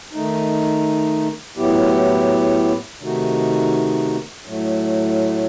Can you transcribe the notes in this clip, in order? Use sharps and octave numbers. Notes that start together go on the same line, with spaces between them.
D#3 A3 D#4
A2 F#3 B3 E4 G4
C3 D#3 A3 D#4 F#4
A2 F#3 A3